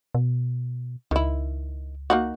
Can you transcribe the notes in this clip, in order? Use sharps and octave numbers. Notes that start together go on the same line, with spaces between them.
B2
C#2 D#3 E4
A#3 D#4 F#4